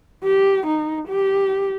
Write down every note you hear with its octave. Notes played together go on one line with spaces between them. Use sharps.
G4
D#4
G4